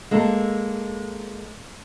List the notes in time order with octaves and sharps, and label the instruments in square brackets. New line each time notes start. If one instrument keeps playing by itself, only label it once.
[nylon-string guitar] G#3 A#3 A4